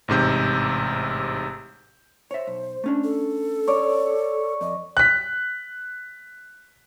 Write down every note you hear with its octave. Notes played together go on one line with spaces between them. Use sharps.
A1 G#2 C3 G6
C5 C#5 E5
B1
A3 C#4 D4
A4
C#5 D5
F2 D#5
F#6 B6